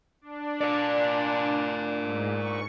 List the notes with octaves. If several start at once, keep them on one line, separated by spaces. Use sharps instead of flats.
D4
A#4 D5
G#2
C#6